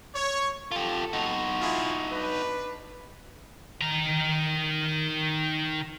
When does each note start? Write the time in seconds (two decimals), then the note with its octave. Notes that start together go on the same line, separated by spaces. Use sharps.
0.15 C#5
0.72 F4 G4 A4
1.13 D#4 F#4
1.60 E4 F4 G#4
2.11 D4 B4
3.81 D#3 A#5